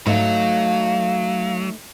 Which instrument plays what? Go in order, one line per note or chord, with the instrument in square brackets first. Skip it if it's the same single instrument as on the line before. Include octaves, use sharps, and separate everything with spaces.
[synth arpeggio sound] G#2 [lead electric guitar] F#3 [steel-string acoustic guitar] A3 D#4 [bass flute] F5